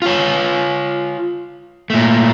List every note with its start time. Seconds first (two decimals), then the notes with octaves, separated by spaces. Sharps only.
0.02 F4 C#5
1.90 A#2 A3